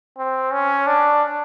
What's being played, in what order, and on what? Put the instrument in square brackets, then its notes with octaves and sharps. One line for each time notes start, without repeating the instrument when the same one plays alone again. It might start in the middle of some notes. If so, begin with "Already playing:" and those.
[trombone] C4
C#4
D4